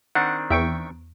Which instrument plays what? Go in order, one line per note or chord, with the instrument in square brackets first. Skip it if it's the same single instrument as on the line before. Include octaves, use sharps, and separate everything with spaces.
[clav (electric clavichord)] D#3 C4 D4 [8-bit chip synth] F#5
[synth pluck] E2 D7 [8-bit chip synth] E5 G5 C#6